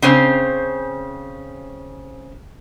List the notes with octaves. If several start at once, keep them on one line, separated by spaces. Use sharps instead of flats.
C#3 C4 C#4 C5